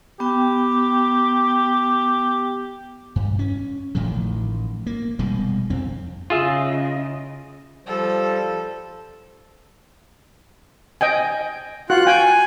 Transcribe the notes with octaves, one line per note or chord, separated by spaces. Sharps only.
B3 G4 G5
G2
C#4
A1 A2 D#3 F3
A#3
F1 B2 G3 G#3
F2 C4
C#3 F4 G#4 D#5 E5
F3 G3 A4
D#5 G5 G#5
F4 F#4 F#6
G5 G#5